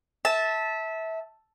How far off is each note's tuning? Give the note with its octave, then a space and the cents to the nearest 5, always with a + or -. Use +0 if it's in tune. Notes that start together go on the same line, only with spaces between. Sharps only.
E5 -20 A5 +0